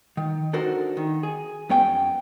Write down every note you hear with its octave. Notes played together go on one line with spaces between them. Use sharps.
D#3
D4 D#4 F#4 A4 A#4 C5
D#3
G#4
F#2 B3 C#5 G5